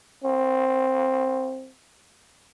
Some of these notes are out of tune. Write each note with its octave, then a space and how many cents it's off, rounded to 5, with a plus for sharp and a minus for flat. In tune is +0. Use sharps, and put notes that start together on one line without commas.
C4 +5